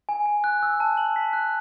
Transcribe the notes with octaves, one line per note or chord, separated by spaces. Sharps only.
G#5
G#5
F#6
E6
A5
F#7
B6
F#6